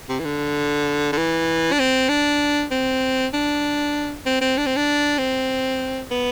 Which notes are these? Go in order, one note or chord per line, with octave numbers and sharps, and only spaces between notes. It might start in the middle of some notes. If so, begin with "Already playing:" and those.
C3
E3
D3
D3
E3
D4
C4
D4
C4
D4
C4
C4
D4
C4
D4
C4
B3